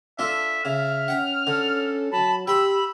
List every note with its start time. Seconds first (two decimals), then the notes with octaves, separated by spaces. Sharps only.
0.19 D4 F4 A4 E5
0.65 C#3 E5 F6
1.08 C#4 F#5 G5
1.47 D3 A4
2.12 F#3 A5 B5
2.47 G4 G5 B5 C6 E6